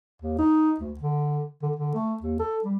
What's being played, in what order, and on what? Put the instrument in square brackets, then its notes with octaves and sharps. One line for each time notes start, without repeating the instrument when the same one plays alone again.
[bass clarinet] D#2
D#4
D2
D3
D3
D3
A3
D#2
A4
G3